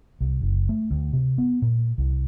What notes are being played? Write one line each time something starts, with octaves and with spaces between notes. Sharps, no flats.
C2
F#1
A3
D2
C3
B3
A#2
C2